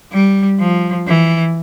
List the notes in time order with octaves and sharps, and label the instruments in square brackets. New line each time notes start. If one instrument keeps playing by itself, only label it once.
[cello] G3
F3
E3